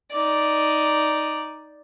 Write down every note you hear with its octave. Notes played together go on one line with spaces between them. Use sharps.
D#4 D5